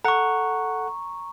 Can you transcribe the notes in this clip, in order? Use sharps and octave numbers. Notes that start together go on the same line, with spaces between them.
A4 F#5 A#5 C#6